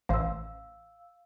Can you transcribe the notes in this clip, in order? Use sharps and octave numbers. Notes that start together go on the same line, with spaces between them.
A1 C5 F5 E6